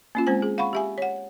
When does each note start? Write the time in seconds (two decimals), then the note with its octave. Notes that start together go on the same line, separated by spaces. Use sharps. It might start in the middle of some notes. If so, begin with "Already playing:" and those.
0.15 A#3 C#4 F4
0.27 G#3 C4 C5 G#5
0.42 G#4
0.58 F5 F#5 B5 C#6
0.73 G4 E5 G#5
0.98 C#5 F#5